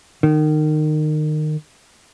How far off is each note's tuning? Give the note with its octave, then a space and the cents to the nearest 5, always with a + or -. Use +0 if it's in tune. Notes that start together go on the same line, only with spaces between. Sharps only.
D#3 -25